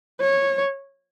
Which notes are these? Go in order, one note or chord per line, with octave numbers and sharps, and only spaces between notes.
C#5